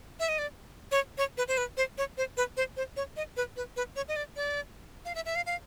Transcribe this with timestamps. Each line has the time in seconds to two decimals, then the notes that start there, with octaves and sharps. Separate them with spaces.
0.20 E5
0.29 D#5
0.39 D5
0.92 C#5
1.18 C#5
1.37 B4
1.48 C5
1.57 B4
1.77 C5
1.98 C#5
2.17 C5
2.37 B4
2.57 C5
2.77 C5
2.97 C#5
3.17 D#5
3.37 B4
3.57 B4
3.76 B4
3.96 C#5
4.08 D#5
4.16 D5
4.36 D5
5.05 F5
5.15 E5
5.26 E5
5.36 F5
5.46 F5